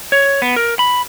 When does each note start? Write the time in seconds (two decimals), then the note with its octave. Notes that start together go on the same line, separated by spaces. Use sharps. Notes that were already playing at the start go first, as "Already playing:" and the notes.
0.12 C#5
0.42 B3
0.56 A#4
0.79 B5